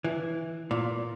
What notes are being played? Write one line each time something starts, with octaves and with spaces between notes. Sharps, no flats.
E3
A#2